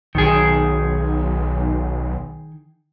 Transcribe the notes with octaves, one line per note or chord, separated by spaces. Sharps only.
B1 D#3 G#4